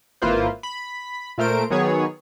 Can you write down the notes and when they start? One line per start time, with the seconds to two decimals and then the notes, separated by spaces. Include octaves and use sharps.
0.22 G#1 A#3 E4 F4 B4 C5
0.63 B5
1.38 A#2 A3 A#4 C5 D7
1.70 D#3 F#3 B3 G#4 C#5